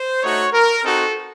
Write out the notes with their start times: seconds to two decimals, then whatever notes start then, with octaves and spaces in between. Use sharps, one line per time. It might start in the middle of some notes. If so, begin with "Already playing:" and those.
Already playing: C5
0.23 A3 D#4 F#4 C#5
0.53 A#4
0.84 C4 D#4 F#4 A4